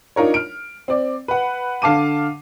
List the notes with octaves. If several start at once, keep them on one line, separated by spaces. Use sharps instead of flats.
D4 D#4 F4 A#4 C#5
F6 D7
C4 D5
B4 F#5
D3 F5 A5 D6 D#7